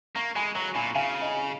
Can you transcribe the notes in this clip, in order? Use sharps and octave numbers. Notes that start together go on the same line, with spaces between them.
A#3 A#5 C#6
G#3 G#5 B5
F#3 A#5 C#6
A#2 G#5 B5
C#3 F5 G#5
D#5